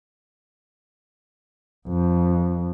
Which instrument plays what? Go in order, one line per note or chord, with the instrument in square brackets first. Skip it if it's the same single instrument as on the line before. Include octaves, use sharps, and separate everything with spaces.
[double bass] F2